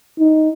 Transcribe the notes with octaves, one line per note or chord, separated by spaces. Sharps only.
D#4